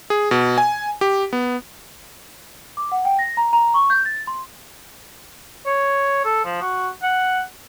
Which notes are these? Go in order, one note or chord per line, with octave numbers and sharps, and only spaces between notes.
G#4
B2
G#5
G4
B3
D6
F#5
G5
A#6
A#5
A#5
C#6
G6
A6
C6
C#5
A4
F3
F#4
F#5